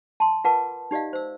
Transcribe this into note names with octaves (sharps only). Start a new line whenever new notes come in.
A5 C6
F4 A#4 B4 F#5 A5 D6
D#4 G4 D5 D#5 F5
C5 E6